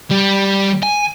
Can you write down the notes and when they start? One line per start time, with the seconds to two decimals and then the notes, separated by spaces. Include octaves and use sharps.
0.11 G3
0.83 G#5